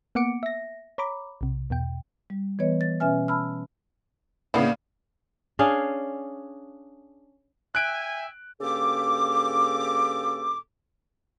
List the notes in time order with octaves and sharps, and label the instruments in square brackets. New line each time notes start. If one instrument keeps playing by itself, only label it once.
[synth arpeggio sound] A#3 B3 F#5 D6 C#7 D7
E5 A#6
C#5 A#5 B5 D6
B1 C3
E2 B2 G5
[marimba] G3
E3 G3 B3 B4 C#5 D#5
A6
B2 C#4 B4 E5 G#5 F6
A5 B5 E6 F6
[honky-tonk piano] A2 C#3 [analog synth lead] A#3 [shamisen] B3 E4 [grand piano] D4 F5 C7
[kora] C#4 D4 G#4 F5
[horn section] E5 G5 G#5 [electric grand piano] F#6 D7
[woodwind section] G2 C#3 A#3 A4 D6